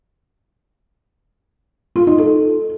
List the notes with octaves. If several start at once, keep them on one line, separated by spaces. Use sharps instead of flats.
F4
D#4
A4